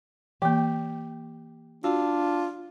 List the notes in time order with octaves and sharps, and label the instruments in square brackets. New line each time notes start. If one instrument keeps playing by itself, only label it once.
[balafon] E3 A#3 [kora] G4
[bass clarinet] D4 [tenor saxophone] F4 [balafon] F#4